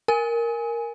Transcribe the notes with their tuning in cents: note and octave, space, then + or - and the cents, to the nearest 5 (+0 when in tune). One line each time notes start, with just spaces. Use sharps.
A#4 +0 G#5 +0